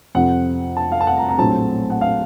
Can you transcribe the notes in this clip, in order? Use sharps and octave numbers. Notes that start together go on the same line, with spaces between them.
F2 C3 F3 C4 F#5
A5
F5
A5
F#5
A#5
A#5
A#1 A2 F#3 C4 A5
F#5
F5